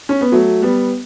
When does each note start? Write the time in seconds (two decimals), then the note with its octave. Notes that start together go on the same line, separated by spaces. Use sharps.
0.09 C#4
0.21 B3
0.32 F#3 A3
0.62 G3 B3